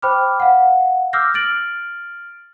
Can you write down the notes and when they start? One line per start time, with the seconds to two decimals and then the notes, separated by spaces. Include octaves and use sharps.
0.02 C5 G5 B5 D6 F6
0.40 F5 F#5
1.13 D6 E6 F6 G6 A#6 C7
1.34 F6 A6 D7 F#7